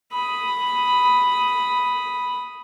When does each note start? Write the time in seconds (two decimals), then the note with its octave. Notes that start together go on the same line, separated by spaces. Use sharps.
0.12 B5 D#6